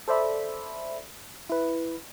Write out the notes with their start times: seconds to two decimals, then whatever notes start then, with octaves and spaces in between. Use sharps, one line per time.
0.08 A4 C5 D5 E5 B5
1.50 E4 B4